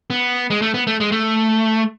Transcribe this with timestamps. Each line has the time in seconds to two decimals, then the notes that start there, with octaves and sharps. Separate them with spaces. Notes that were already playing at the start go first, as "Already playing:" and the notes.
0.10 B3
0.50 G#3
0.62 A3
0.74 B3
0.87 A3
1.00 G#3
1.12 A3